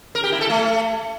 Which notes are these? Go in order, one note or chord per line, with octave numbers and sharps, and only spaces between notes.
A#4
G4
E4
A4
A3